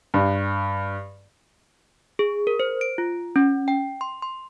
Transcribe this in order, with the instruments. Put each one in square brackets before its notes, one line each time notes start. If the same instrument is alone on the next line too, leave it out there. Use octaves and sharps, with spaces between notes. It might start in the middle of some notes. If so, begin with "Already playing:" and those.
[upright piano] G2
[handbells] G#4
A#4
C5
D7
F4
C#4
G5
C6
C6